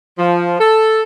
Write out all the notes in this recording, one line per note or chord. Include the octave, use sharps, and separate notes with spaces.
F3
A4